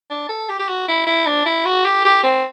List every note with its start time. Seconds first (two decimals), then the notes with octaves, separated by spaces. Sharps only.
0.10 D4
0.29 A4
0.49 G4
0.59 G4
0.69 F#4
0.88 E4
1.07 E4
1.27 D4
1.45 E4
1.65 F#4
1.85 G4
2.05 G4
2.23 C4